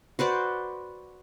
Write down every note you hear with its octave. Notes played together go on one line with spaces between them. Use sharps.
F#4 B4 C5 D5